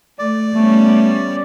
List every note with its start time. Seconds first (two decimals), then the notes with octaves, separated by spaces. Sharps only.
0.19 A3 D5
0.54 G3 A3 B3 C#4